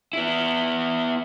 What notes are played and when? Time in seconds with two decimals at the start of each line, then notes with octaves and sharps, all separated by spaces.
0.13 B3 E4